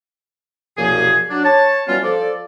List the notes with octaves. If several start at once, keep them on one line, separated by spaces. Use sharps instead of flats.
C2 F#2 B2 F3 A#3 G#4
F#3 D4
C#5 A5
E3 F#3 G3 B3 C#4 F4
F3 A4 D5